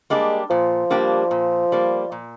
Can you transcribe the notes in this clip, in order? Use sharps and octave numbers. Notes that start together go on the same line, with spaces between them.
G3 G#3 A#3 D4 G4
A#2 F3
G3 A#3 D4 G4
A#2
G3 A#3
A#2